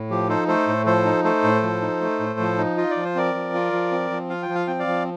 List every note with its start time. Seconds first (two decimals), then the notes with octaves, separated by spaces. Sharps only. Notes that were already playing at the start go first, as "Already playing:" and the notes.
Already playing: A2
0.10 F3 G4
0.29 D#4 A4 C5
0.48 A3 A4 C5
0.68 A2
0.86 F3 A4 C5
1.05 D#4
1.24 A3 A4 C5
1.44 A2
1.63 F3
1.82 D#4
2.01 A3
2.20 A2
2.39 F3
2.58 D#4
2.77 F4 D#5
2.91 D5
2.97 F3
3.05 C5
3.15 C4 A#4 D5
3.34 F3
3.54 F4
3.73 F3
3.92 C4
4.11 F3
4.30 F4 F5
4.42 G5
4.49 F3
4.55 F5
4.67 C4 G5
4.79 D5 F5
4.87 F3